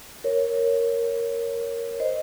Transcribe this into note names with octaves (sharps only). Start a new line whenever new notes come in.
A#4 C#5
C5 D#5